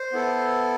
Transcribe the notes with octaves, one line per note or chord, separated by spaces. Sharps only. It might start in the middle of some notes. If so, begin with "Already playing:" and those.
Already playing: C5
B3 E4 A4